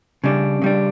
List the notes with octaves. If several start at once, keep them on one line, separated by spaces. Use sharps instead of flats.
C#3 G3 D4
C#3 G3 D4